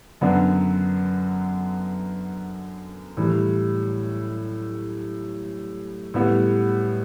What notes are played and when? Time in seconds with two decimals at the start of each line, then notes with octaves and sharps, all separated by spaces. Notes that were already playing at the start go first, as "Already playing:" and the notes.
0.21 F#2 D3 F#3 B3 D4
3.17 A2 E3 G3
6.14 A2 G3 B3